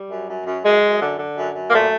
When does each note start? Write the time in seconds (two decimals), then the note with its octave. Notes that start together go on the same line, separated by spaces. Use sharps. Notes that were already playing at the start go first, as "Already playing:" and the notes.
Already playing: G3
0.10 F#2
0.29 F#2
0.46 F#2
0.64 F#2 G#3
0.82 F#2
1.01 D3
1.18 D3
1.36 F#2
1.54 F#2
1.68 A#3
1.72 A#2 A3